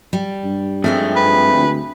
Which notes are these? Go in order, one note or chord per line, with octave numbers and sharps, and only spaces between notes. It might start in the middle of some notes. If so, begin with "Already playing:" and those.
G3
G2
F2 G#3 A3 C4 G#4
B4
D2